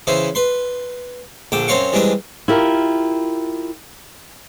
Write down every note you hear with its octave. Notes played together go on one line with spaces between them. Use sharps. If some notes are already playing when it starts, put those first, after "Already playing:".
C#3 E3 C#4 E4 C5
B4 C6
A#1 D3 G5 D6
F#2 C4 C5 C#5 F5 C#6
E3 G3 G#3 C4 D4
E4 F4 G4 A#4